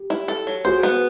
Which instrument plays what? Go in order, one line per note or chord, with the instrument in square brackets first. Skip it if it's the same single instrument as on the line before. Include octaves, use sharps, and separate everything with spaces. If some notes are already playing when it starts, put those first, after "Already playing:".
Already playing: [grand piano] G4
[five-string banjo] E4
A4
F#3
[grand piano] F#4 G#4 [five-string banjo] C5
[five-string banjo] B3